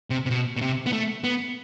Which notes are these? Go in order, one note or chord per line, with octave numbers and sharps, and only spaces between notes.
C3
C3
B2
B2
C3
B3
A3
B3